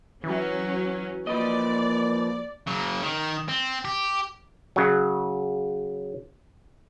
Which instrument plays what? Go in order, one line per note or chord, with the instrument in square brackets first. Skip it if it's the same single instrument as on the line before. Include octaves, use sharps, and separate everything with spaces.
[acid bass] E3 [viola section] F#3 C#4
[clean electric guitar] F3 B4 D#5 [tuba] A#3 [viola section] D5
[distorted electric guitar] C#3 F#3
D#3
C4
G4
[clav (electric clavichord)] C#3 F#3